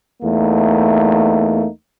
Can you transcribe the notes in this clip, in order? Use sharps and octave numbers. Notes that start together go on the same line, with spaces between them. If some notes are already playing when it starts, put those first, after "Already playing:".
E2 A3 A#3 D#4